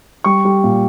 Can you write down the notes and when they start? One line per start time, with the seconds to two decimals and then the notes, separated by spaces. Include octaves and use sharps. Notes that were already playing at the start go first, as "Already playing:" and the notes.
0.24 G3 C#6
0.45 G3
0.64 A#2